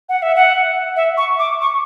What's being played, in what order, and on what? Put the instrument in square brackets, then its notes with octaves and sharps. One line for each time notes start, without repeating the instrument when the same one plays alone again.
[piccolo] F#5
E5
F#5
E5
C#6
D6
C#6